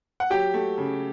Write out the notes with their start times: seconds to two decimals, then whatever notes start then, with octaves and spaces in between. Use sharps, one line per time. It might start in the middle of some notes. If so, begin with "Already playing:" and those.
0.20 F#5
0.30 F#3 G4 G5
0.54 A3
0.78 C#3